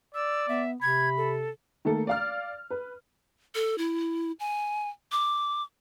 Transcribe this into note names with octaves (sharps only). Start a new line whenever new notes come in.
D5 E6
B3 E5
C3 B5 G#6
A4
D#3 A3 A#3 A4
D5 F5 F6
B4
A4
E4
G#5
D6